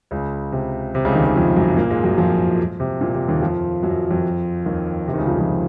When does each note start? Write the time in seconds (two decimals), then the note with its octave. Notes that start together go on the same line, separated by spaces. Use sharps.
0.11 C#2 C#3
0.52 C3
0.95 C3
1.05 C#2 C#3
1.15 D#2 D#3
1.25 D#2 D#3
1.36 F2 F3
1.56 F#2 F#3
1.76 A#2 A#3
1.90 G#2 G#3
2.04 F#2 F#3
2.17 F2 F3
2.80 C3
3.01 A#2
3.14 C3
3.28 D#2 D#3
3.42 F2 F3
3.83 F#2 F#3
4.10 F2 F3
4.66 D#2 D#3
5.08 C3
5.14 D#3
5.18 C#2 C#3
5.27 F2 F3
5.38 F2 F3